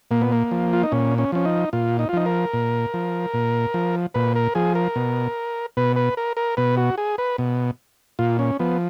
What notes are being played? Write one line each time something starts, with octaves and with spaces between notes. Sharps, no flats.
A#2 A#3
B3
A#3
F3
F4
D#4
A#2 C#4
C#4
F3 C#4
D#4
A#2 F4
D#4
F4
F3 D#4
A#4
A#2
F3
A#2
F3
A#2 B4
A#4
F3 G#4
A#4
B2
B2 B4
B4
A#4
A#4
B2 B4
F#4
G#4
B4
B2
A#2 F4
C#4
F3 B3